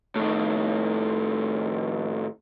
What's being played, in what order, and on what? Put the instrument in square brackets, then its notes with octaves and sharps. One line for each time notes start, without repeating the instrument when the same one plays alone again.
[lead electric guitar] A2 D#3